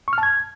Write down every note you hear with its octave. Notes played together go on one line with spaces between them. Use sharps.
C#6
F6
A5
G#6